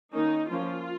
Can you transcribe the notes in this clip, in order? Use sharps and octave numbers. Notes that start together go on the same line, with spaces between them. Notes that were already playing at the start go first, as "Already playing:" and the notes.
D#3 A#3 C#4 D#4
F3 A#3 C#4 F4